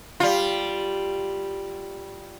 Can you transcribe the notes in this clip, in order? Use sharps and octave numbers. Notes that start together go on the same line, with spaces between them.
G3 F4